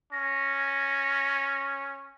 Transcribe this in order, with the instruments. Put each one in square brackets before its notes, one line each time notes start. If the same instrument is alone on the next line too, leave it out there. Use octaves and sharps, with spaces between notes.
[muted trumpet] C#4 [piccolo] A#6